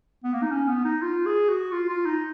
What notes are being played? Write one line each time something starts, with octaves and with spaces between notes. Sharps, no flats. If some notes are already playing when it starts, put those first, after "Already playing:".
B3
A#3
D#4
C#4
B3
D#4
F4
G#4
F#4
F4
F4
D#4